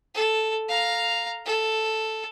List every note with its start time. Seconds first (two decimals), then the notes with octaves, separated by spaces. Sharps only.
0.15 A4
0.69 F5 A#5
1.46 A4